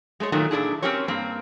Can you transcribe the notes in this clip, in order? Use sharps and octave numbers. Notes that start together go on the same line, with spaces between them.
G#3 A3 A4 C#5
A#2 D#3 F#3 A3
A#2 D4 E4 G#4
C4 C#4 F#4 G4 A#4 C#5
G2 A#3 C4